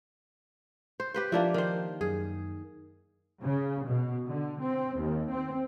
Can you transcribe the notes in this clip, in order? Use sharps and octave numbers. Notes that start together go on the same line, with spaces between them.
C5
G4 B4 C5
F3 A#3 D4 E4
D#3 C5
F#2 G#4
C#3
B2
D3
C4
D#2
C4